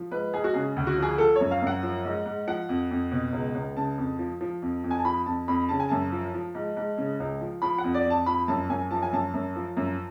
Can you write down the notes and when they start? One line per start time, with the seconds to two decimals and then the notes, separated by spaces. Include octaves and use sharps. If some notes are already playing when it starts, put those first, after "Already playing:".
Already playing: F3
0.11 G#2 B4
0.33 G#2 G#4
0.44 F#4
0.54 C#3 G#4
0.76 D2
0.87 F#4
0.98 F3
1.03 G#4
1.18 F3 A4
1.35 C#5
1.41 F#2
1.51 F5
1.62 F#2 F#5
1.83 F3
2.05 G#2
2.26 G#2
2.47 F3 F#5
2.69 F2
2.91 F2
3.12 B2
3.33 C#2
3.55 C#2
3.76 C#3 A5
3.98 F2
4.19 F3
4.41 F3
4.62 F2
4.84 F2
4.91 G#5
4.98 A5
5.05 F3 B5
5.26 F2 A5
5.48 F2 B5
5.69 C#3 A5
5.80 G#5
5.89 F#2 A5
6.12 F3
6.34 F3
6.55 G#2
6.77 G#2
6.98 C#3
7.20 C#2
7.41 F3
7.62 F3 B5
7.78 F#5
7.84 F2
7.94 D5
8.06 F2 A5
8.26 F3 B5
8.48 F#2 A5
8.69 F#2 G#5
8.91 F3 A5
9.02 G#5
9.13 F#2 A5
9.34 F#2
9.56 F3
9.77 F#2